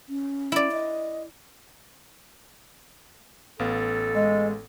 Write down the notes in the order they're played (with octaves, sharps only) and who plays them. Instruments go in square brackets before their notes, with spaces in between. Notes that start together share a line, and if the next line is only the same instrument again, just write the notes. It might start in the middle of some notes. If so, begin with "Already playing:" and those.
[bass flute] C#4
[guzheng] E4 D5
[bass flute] D#5
[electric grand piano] A1 B3 F5 [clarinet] A4
[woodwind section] G#3 [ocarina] D#5